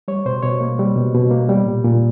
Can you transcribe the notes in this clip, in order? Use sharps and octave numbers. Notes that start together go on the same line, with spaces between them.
G3 C#5
B2 C5
B2 C#5
A#3
G3
B2
B2
A#3
G3
A#2
A#2